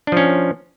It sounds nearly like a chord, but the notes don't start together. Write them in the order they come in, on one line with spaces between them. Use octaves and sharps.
D4 F3 C#4